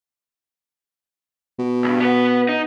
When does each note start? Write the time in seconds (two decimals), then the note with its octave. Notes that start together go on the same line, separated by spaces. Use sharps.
1.59 B2
1.84 C#2 G2
2.01 B3 B4
2.49 D#4